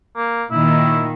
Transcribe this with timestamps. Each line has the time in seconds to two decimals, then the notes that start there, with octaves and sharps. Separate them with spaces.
0.16 A#3
0.51 A#2 D#3 E4